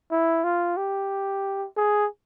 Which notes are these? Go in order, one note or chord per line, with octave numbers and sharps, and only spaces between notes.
E4
F4
G4
G#4